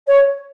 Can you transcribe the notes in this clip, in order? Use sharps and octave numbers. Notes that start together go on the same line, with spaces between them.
C#5